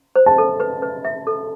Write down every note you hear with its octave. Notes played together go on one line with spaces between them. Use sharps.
C5
A5
A4
B4
B4
E5
A4